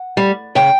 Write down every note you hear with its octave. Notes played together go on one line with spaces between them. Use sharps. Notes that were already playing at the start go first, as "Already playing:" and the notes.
Already playing: F#5
G3
C#3 G5